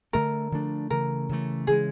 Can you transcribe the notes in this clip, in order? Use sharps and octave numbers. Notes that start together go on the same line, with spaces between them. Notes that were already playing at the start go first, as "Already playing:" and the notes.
D3 F3 A3 D4 A#4
D3 F3 A3 D4
C#3 E3 A3 A#4
C#3 E3 A3
C#3 E3 G#3 G#4